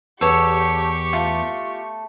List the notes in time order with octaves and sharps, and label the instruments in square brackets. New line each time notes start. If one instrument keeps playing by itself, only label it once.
[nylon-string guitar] E2 [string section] G4 C#6 [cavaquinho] A4 C#5
[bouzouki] A3 [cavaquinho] F4